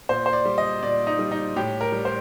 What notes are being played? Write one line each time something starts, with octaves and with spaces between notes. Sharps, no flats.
A#2 C5
C5
D5
G3
D#5
A#2 D5
D#4
G3
D#4
A2 G4
A#4
G3
C5